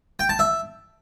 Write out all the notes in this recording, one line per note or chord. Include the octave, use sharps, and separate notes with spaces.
G5
A5
E5